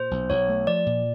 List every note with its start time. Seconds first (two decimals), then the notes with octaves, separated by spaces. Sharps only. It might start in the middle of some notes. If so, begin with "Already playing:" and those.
Already playing: A#2 C5
0.11 B1
0.30 B1 C#5
0.49 A3
0.67 F3 D5
0.86 A#2